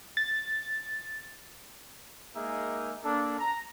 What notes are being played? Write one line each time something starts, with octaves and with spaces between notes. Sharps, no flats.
A6
G#3 A#3 D#4 G#4 A#4 E5
A#3 D4 A4
A#5